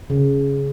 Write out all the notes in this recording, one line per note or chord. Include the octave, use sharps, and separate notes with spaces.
C#3